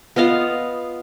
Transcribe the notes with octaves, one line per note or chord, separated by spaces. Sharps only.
B3 F4 D#5 F5